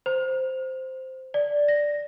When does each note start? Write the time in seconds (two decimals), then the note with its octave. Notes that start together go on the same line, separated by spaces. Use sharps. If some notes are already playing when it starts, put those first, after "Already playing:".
0.06 C5
1.34 D5
1.68 A#6